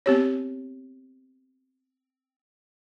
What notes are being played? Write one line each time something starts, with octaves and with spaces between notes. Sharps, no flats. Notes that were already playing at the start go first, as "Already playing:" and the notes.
B3 C4 G4 C#5